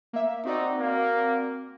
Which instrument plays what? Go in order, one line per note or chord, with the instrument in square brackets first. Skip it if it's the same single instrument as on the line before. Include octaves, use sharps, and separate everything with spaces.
[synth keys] A#3 E5
[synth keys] C4 F#4 D5 [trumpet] D#4
[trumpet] A#3